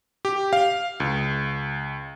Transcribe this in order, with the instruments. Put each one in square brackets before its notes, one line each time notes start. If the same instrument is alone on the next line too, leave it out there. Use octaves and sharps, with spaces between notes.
[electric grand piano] G4
F5
C#2